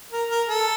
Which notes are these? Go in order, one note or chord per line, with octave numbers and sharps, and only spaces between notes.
A#4
A#4
A4